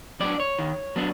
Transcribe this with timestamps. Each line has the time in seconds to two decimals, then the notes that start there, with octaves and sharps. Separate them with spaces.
0.20 F#3 B3 D4 D5
0.40 C#5
0.59 D#3
0.96 F#3 B3 D4